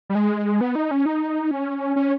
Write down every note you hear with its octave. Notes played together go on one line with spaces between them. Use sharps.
G3
G#3
B3
D#4
C#4
D#4
C#4
C#4